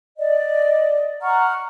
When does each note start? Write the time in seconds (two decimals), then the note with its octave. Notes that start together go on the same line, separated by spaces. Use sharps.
0.18 D5 D#5
1.22 F#5 A#5 C#6 F6